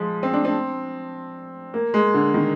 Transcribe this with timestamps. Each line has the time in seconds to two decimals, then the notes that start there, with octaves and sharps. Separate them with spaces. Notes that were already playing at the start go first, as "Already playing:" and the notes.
Already playing: F3 G#3
0.23 C4
0.33 D4
0.45 C4
1.74 A#3
1.94 G#3
2.14 D3
2.34 D#3